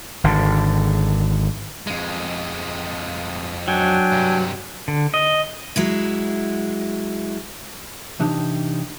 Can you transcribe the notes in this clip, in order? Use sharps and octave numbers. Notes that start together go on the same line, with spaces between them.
G#1 D3
F2 G#3
F#3 D4 G5 G#5
G2 C3
D3
D#5
F#3 G#3 E4
C3 E3 D4 D#4 G4